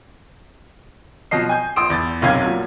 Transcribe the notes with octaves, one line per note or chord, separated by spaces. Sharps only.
B2 F3 F#3 D#5 C7
G#5 G6
A#1 C6 D#6 E6 D7
E2 A6
F#1 B1 C3 C#4 F5 G#6
A#2 F3 F#3